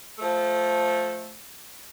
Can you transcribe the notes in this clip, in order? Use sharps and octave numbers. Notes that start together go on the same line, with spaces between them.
F3 A3